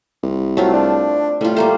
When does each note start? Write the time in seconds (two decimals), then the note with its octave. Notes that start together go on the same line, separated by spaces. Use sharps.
0.23 C2
0.57 F#3 A3 C4 F4
0.73 D4
1.41 A2 G3 F4
1.56 G3 A3 A#3 C5